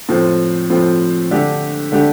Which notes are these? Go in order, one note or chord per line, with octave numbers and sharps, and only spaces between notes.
A2 F3 C4
A2 F3 C4
D3 A3 D4 G4
D3 A3 D4 G4